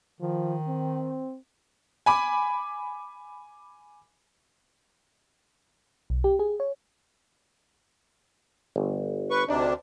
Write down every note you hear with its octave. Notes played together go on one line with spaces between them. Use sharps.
D#3 F3
C4
G#5 B5 D6
B1
G4
G#4
C#5
G1
B4 C#6
D2 C3 D4 D#4 D5